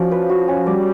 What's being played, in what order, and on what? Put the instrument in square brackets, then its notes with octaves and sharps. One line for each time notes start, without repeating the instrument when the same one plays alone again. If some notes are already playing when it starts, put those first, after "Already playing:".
Already playing: [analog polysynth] F3 [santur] C#4 F#4 D5
[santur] B4
F#4
C#4
[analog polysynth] G3 [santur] D5